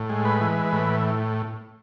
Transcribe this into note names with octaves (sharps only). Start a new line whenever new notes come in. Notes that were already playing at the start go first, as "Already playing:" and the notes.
Already playing: A2
G#3
B4
E3
A2